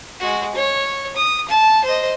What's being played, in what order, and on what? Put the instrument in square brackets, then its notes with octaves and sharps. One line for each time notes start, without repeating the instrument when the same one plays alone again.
[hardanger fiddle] G#3 F#4
C#5
D#6
A5
C5 D#5